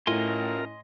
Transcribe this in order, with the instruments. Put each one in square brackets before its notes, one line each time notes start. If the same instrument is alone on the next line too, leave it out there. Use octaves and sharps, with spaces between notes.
[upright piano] A2 [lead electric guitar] C#4 E4 [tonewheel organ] F4 A#4 [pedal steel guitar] D#5 G#5 C6